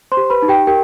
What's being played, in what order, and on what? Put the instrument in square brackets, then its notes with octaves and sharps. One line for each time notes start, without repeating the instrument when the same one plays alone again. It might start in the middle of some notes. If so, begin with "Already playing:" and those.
[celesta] C5 C6
G4
B4 B5
D#4
G4 G5
G4 A#4 G5